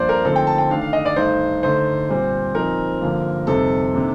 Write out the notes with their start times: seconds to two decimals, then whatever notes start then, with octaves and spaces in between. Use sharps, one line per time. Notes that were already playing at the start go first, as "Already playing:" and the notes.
Already playing: G2 F3 A#3 D4 C5 D5
0.09 A#4
0.24 D3 F3 A3 C4 D#4 A4
0.36 G5
0.47 A5
0.58 G5
0.70 D#3 A3 D4 F5
0.81 F5
0.93 D#5
1.05 D5
1.16 G2 D#3 A3 D#4 C5
1.62 D3 A3 D#4 C5
2.08 A#2 G3 C4
2.55 A#2 F3 C4 D#4 A#4
3.01 G2 D3 F3 A#3
3.47 F2 C3 G3 C4 D#4 A4
3.94 C3 D#3 A#3 D4